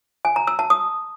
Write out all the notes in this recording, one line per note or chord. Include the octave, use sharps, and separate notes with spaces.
G#5
A#5
E6
A5
D#6